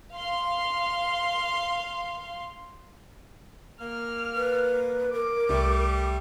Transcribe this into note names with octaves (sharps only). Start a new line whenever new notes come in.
F5 C6
A#3 F6
B4
A#4 D6
C2 G3 A3